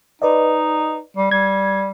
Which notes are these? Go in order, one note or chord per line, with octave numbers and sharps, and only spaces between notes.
D#4 B4 D5 D#5
G3
G3 G#6